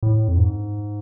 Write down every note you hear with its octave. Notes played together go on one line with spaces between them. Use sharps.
A2
F2
G#2